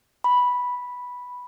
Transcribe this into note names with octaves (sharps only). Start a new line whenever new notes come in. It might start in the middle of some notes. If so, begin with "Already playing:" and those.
B5